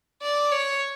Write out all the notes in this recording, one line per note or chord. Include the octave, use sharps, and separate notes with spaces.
D5
C#5